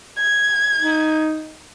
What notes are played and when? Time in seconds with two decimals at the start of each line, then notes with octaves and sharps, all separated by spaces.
0.17 G#6
0.80 D#4